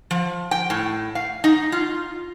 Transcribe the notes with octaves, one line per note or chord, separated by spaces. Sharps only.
F3
G5
A2
F5
D#4
F4